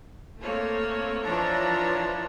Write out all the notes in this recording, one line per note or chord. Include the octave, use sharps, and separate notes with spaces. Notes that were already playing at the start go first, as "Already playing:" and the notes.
A3 A#3 C4 C#5
E3 F3 D4 C#5 A#5